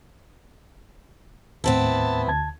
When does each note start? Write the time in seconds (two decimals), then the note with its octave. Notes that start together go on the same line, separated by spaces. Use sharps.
1.64 D#2 A2 B3 C4 E4 A5
2.28 D2 A5 G#6